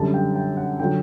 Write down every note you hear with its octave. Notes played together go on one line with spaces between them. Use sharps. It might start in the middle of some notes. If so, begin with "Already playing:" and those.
Already playing: F#2 D3 G3 A5
G5
G5
F#5
D3 F#3 G5